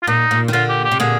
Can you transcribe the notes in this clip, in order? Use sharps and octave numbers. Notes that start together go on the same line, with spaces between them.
F4
A#2 D#4
A#2
D#3
A#2 D3 F4
G4
G4
C3
A#2 D3 G#4